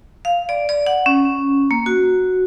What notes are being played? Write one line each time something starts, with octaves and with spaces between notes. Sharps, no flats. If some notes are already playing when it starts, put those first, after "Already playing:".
F5
D5
D5
F#5
C#4
A#3
F#4